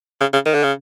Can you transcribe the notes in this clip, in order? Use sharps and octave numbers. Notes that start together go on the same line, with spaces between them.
C#3
C#3
D#3
D3
C#3